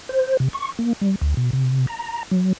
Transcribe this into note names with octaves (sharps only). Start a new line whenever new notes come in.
C5
C3
C#6
A#3
G3
D2
B2
C3
A#5
F#3